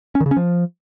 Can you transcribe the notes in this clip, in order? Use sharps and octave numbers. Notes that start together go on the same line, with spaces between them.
C#4
D#3
C#3
C#4
F3